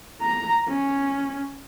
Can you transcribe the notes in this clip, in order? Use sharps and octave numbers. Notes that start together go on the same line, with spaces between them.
A#5
C#4